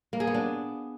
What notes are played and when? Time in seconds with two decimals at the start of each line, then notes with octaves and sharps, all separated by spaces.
0.13 A#3
0.20 G#4
0.27 B3
0.34 D4